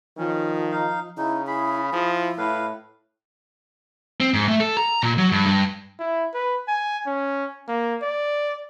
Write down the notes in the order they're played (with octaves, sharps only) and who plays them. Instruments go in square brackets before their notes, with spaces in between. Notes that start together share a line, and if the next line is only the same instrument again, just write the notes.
[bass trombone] D#3 [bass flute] F3 [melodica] C#4
[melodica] D#4 F5
[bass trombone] C#3 [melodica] D#4 [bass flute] E4
[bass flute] E4 [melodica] G#4 B5
[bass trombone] F3 [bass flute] E4
[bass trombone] A2 [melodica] B4 F5
[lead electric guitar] C4
G#2
A3
A4
A#5
A#2
F#3
G2
G2
[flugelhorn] E4
B4
G#5
C#4
A#3
D5